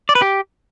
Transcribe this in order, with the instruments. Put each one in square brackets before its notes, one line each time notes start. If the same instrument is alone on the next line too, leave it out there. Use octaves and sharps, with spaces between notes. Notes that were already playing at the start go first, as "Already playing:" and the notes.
[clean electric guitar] D5
B4
G4